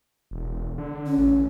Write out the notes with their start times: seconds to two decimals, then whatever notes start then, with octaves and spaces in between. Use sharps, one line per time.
0.31 E1
0.78 D3
1.06 C#4
1.17 A1